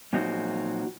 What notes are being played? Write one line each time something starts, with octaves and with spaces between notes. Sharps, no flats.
A#2 F3 F#3 C4 D#4 F#4